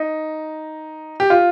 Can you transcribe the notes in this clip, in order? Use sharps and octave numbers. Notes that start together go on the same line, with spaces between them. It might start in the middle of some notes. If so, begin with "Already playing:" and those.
Already playing: D#4
G4
F4